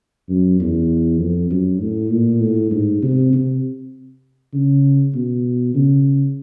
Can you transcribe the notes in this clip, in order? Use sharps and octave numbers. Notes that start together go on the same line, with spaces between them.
F#2
E2
F2
F#2
A2
A#2
A2
G#2
C3
C3
C#3
B2
C#3